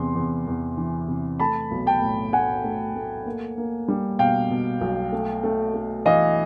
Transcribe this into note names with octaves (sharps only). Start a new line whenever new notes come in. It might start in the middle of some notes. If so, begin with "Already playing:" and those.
Already playing: E2 C3 C6
E2
E2
E3
C3
A3 A5 B5
B1
G5 A5
A2
A3 F#5 G#5
A3
A3
A#3
A#3
G3
B2 F5 G5
B2
B1
A3
A3
A3
E3 D#5 F5